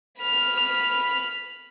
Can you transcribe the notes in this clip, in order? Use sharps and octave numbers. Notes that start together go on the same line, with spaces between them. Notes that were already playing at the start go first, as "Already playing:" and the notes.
B5 F6